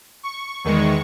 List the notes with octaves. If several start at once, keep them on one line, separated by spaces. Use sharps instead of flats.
C#6
E2 D#3 G#3 C#6